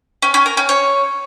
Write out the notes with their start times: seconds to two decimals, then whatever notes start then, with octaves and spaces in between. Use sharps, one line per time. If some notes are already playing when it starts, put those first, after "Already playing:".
0.22 C#4
0.34 C#4
0.46 A#4
0.57 C#4
0.69 C#5